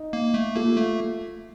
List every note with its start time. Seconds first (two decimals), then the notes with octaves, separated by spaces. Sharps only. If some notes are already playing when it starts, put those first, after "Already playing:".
Already playing: D#4
0.13 A#3
0.34 A3
0.56 A#3 F4 A4
0.77 A3